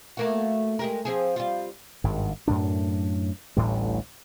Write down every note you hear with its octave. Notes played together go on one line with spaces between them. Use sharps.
A3 A#3 F#4
G#3 G4 A#4
F3 C4 G#4
G3 F4
G#1 G2
F#2 A2 D4
A1 D2 A2 G3